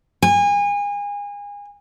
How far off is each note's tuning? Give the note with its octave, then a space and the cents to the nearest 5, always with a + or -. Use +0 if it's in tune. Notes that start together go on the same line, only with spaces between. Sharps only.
G#5 -30